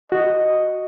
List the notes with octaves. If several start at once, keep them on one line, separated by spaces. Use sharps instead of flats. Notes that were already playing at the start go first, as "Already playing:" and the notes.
F#4 D#5